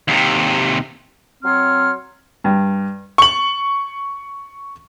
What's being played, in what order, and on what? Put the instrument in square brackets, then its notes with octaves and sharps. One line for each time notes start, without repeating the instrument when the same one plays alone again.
[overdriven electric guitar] D#2 C3
[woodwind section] F#3 C4 C#5 C6 F6
[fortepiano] G2
[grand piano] C#6 F#7